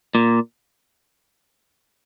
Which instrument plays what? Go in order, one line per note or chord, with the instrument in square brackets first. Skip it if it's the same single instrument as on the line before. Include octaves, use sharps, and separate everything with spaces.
[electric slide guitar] A#2